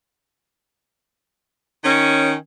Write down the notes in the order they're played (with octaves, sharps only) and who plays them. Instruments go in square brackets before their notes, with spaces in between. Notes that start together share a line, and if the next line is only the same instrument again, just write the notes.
[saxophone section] D#3 C#4